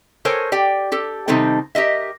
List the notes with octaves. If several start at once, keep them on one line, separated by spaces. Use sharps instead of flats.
A4 A#4 C5 C#5 G#5
G4 D5 G5
G4 A4
C3 D#3 G3 C4 D#4 A4
G4 A#4 D#5 E5